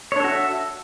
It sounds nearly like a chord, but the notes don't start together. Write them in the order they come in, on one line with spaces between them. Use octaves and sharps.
C#5 D4 A4 F#4 E5